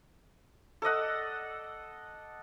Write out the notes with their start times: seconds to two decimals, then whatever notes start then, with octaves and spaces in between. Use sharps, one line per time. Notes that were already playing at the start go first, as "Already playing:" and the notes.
0.82 A4 D5 D#5 F#5